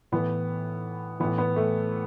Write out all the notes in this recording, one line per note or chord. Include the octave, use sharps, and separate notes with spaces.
A2 E3 B3
A2 E3 B3
B3
A3